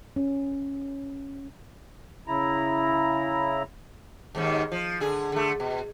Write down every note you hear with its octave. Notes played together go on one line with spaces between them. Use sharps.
C#4
C#3 E4 A#5
D#2 G#2 D#3
F3
D3 G#4
D3 A3
B2